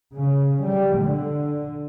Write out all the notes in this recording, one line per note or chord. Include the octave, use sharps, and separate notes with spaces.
C#3
G3
D3